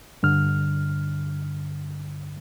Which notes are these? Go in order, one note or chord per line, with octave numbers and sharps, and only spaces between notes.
G2 D3 F6